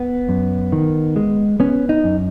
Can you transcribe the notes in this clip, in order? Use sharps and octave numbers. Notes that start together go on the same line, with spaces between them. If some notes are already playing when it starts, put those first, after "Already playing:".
Already playing: B3
F#2
D#3
G#3
B3 C#4
D#4
F#2